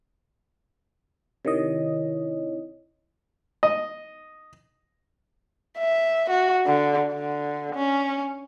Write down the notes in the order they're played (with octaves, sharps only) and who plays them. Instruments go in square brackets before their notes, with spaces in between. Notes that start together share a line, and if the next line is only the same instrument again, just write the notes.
[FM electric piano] C3 D#3 D#5 [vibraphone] E4 C#5
[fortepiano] D#5
[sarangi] E5
F#4
D3
D3
C#4